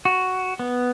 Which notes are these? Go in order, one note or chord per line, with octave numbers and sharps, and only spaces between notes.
F#4
B3